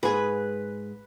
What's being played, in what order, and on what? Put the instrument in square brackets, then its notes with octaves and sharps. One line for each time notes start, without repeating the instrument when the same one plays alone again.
[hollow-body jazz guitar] G#2 G#4 [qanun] B4